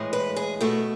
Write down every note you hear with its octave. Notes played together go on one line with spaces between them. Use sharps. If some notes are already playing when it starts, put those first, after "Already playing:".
Already playing: A2 E3 G#3
B4
G#4
B2 A3 E4